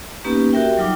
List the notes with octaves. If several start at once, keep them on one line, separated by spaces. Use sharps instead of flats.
A#3 B3 C#4 D#4 G4 B4
F#4 G4 A#4 E5 G5
F#3 G3 D#4 F4 G5 D6